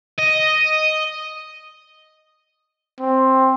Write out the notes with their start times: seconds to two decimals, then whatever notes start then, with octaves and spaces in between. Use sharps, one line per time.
0.19 D#5
3.01 C4